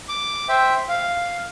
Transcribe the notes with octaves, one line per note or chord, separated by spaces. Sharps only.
D6
C5 E5 G5
F5